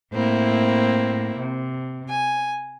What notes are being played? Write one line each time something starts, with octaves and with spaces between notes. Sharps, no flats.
A2 A#3 C4 E4
C3
G#5